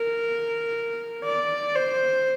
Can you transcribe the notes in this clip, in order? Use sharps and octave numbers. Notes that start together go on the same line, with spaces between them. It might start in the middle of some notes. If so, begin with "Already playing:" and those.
Already playing: A#4
D5
C5